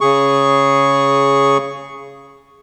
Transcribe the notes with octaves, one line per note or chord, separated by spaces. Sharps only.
C#3 G#4 C#6